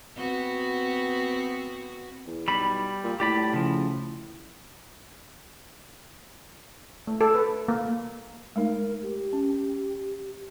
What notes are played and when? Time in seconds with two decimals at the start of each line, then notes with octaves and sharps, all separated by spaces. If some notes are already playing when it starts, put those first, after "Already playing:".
0.16 B3 C4 F#4
2.27 E2
2.48 B1 G3 B5
3.04 A#2
3.20 A2 G4 D5 B5
3.54 C#3 F3
7.07 A3
7.21 A4
7.35 B4
7.68 A#3
8.56 G#3 A3 D#4 A#4
9.02 G4
9.33 C#4